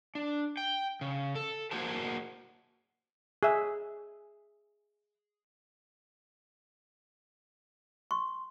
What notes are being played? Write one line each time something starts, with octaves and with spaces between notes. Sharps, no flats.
D4
G5
C#3
A4
A#3 F#4 G#4 C5 A5
G#4 E5
C6 C#6